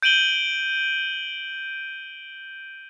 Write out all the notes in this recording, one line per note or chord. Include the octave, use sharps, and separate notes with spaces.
G6 D7 D#7 F#7 G7